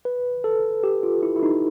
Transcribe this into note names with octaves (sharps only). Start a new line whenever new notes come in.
B4
A4
G4
F4
E4
E4
D#4